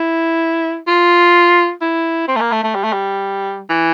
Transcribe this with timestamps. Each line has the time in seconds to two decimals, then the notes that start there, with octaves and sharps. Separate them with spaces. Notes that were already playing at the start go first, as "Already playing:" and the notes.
Already playing: E4
0.87 F4
1.81 E4
2.28 C4
2.36 A3
2.41 A#3
2.52 A3
2.64 A3
2.75 G3
2.84 A3
2.93 G3
3.69 E3